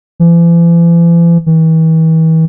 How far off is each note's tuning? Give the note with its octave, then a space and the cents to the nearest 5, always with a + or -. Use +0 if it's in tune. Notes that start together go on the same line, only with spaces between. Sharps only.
E3 +45
E3 -40